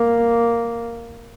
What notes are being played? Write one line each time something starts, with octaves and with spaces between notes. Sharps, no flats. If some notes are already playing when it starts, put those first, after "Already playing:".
Already playing: A#3